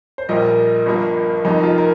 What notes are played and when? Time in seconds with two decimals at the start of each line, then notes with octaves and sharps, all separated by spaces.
0.18 C5
0.29 A#1 A#2 G3 A#3 D#5
0.86 G1 G2 F3 A#3
1.45 F1 F2 F3 A#3 D#4
1.63 F4
1.78 A#4